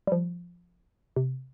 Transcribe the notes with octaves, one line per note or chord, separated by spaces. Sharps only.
G3
F3
C3